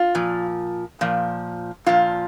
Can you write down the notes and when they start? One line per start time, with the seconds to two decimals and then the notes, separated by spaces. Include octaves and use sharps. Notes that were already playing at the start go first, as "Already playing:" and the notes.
Already playing: F4
0.15 A#2 F3
1.01 A#2 F3
1.86 A#2 F3 F4